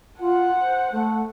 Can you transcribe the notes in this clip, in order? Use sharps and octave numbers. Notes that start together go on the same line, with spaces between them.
F4 F#5
C5
A3